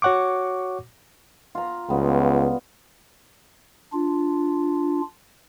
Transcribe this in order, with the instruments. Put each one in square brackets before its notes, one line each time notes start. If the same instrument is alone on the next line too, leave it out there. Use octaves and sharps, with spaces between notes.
[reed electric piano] F#4 C#5 F#5 C#6 D6
[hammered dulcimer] F4 A#5
[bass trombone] C#2 [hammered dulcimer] G3 B3
[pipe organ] D4 F4